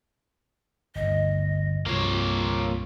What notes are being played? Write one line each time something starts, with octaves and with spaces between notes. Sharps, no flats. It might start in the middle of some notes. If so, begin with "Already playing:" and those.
G1 D2 D#5
C2 G2 A#3 F4 C#5